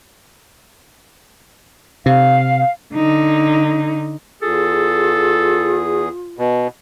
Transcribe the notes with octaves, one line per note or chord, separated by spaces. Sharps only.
C3 F5
D3 D#4
E2 F4 G#4 A4
B2